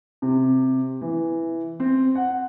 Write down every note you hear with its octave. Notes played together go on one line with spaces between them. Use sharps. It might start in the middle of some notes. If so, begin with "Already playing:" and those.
C3
E3
C4
F#5